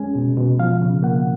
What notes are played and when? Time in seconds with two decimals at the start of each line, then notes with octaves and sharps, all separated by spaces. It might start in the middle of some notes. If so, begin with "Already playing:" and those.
Already playing: G#3 C#4 G#5
0.15 B2
0.37 B2
0.59 F3 F5
0.82 C#3
1.03 A#3 F#5